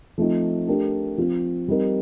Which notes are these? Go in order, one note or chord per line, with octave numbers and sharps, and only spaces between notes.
F3 A3 C4 D#4
A3 D4 G4 A#4
F3 C4 F4
G3 C4 D#4 A#4